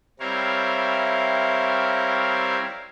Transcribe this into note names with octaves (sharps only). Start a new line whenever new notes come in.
G3 C4 E4 A#4 C#5 F5